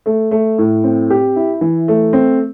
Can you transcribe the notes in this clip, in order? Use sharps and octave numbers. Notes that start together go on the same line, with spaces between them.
A3
A3
A2
C4
G4
E4
E3
A3
C4